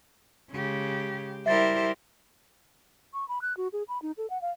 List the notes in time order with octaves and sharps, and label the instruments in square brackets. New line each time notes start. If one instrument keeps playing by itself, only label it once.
[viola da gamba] C#3 [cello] G#3 G4
[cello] G3 A#4 [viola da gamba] E4 G4 C5 [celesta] E5 A6
[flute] C#6
B5
F#6
F#4
G#4
B5
D#4
A4
F#5
F5